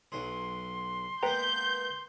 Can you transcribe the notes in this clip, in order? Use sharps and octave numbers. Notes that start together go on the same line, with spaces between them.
B1 F#3 G#4 C6
G#3 A#3 B3 B4 G5 A#5 G6